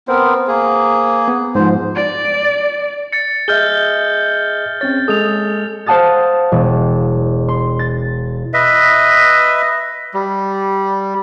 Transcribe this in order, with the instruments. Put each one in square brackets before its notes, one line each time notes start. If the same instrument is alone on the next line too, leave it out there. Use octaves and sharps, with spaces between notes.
[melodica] B3 C4 A#4 [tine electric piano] C5
[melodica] A#3 G#4
[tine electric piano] B3
[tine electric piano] G#2 F3 [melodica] C5
[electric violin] D5
[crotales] A6 C#7
[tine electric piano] G#4 D#5 E5 [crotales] F6 G6 G7
[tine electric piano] C4 C#4 C#5 [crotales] A6
[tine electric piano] G#3 G#4 A4 [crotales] D#6 F7
[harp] C5 F5 F#5 A5 D#6 A6
E1
C6
A6
[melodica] B4 D#5 E5
G3